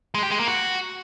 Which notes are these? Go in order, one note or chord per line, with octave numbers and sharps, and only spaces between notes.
G#3
G4
G#3
A#3
F#4